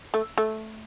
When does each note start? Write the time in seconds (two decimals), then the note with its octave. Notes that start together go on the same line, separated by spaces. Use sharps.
0.14 A3
0.38 A3